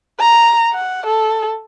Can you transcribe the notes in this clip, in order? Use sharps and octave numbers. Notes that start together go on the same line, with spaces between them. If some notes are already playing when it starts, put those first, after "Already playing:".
A#5
F#5
A4